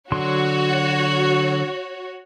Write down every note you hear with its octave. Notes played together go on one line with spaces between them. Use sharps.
D3 F#3 F#4 C#5 C6